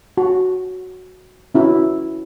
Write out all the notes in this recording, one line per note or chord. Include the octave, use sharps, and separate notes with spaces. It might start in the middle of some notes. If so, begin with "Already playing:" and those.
F#4
C#4 E4 F#4